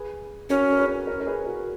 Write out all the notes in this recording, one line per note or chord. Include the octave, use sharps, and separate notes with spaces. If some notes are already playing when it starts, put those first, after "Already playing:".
Already playing: G#4 B4
C#4 F#4 A#4
A#4
G#4 B4
A#4 C#5
A#4
G#4 B4
F#4 A#4